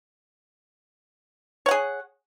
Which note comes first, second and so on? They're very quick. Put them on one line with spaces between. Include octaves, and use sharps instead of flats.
C#5 F#5 G#4